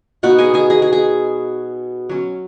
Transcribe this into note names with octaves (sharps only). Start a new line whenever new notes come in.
B2 B3 D#4 F#4 F#5
G#4 G#5
G#4 G#5
G#4
G#4
G#4
F#3 C#4